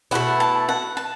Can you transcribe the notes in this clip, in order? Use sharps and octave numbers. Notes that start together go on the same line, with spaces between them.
B2 A3 E4 F#5
A5
F#5
A5